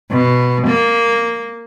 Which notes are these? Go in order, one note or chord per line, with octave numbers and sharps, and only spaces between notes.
B2
A#3